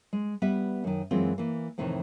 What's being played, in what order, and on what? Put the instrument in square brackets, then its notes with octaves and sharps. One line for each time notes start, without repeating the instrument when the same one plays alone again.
[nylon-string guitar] G#3
G3 B3 B4 E5
F#2 D#3
F#2 E3 G#3 C4 F4
E3 A#3
F2 A2 C3 D#3 E3 D#4